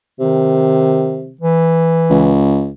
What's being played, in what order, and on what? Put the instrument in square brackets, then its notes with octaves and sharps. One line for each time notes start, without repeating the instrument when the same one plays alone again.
[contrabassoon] C3 [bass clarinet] D#3
[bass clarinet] E3
[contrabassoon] C#2